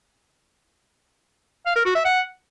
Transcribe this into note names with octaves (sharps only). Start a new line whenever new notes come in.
F5
A#4
F#4
E5
F#5